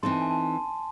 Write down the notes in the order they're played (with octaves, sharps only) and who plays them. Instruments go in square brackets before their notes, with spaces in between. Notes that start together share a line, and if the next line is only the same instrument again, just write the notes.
[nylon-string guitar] E3 C4 D#4 A4 [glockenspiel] C6
[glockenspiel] A5
G#5
A5